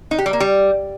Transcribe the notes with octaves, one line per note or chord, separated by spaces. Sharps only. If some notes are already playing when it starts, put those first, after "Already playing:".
D#4
G4
G3
A#3
G3